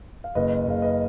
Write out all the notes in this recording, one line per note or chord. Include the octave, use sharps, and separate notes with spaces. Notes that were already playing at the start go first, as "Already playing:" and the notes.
F5
F#1 B4 D#5
F#1 F5
B4 D#5